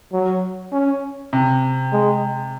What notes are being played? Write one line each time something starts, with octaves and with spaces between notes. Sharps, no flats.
F#3
C#4
C3
G#3